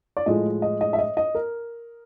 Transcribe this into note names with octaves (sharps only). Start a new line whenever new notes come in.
D5
A2 F3 G#3 D#5
D#5
D#5
E5
D#5
D#5
A#4